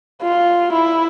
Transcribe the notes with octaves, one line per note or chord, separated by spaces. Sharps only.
F4
E4